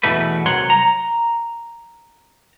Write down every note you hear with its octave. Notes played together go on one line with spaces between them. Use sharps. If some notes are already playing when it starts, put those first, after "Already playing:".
E2 B2 E3 A3 B4
C2 F#3 C#5 F#5 C6
A#5